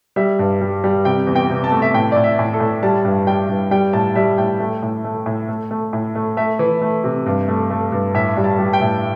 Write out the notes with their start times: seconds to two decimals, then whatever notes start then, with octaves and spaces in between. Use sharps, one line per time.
0.16 G3 E5
0.39 G2
0.61 G3
0.84 G3
1.05 C3 G5
1.27 E2
1.35 G5
1.50 C3
1.64 A5
1.72 A3
1.82 E5
1.94 A2 G5
2.12 A2 D5
2.24 E5
2.39 A2
2.53 A4
2.60 A2
2.83 G3 A5
3.05 G2
3.27 G3 G5
3.49 G2
3.71 G3 G5
3.93 A2 A5
4.16 G3 E5
4.38 A2 G5
4.60 A3
4.82 A2
5.04 A3
5.26 A2
5.49 A3
5.71 A3
5.93 A2
6.15 A3
6.37 A3 E5
6.59 E3
6.82 A3
7.04 C3
7.26 G2
7.48 A3
7.70 A3
7.92 G2
8.14 A2 E5
8.37 G3
8.44 A5
8.59 G3
8.73 G5
8.81 A2